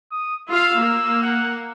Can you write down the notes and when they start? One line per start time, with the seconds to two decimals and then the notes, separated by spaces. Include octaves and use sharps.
0.11 D#6
0.50 F4 F5 E6
0.79 A#3
1.23 F#5